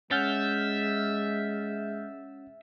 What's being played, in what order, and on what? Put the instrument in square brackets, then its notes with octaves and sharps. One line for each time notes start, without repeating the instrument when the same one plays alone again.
[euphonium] G#3 [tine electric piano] C#4 F#5 [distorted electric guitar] E5 [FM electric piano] F6 G6 A6